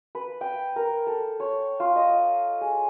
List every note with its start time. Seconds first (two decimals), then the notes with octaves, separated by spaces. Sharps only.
0.15 B4
0.41 G5
0.76 A#4
1.07 A4
1.40 C#5
1.80 F4
1.96 D#5
2.61 G#4